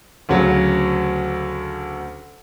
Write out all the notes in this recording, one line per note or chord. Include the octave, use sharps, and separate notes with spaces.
D2 C#3 F#3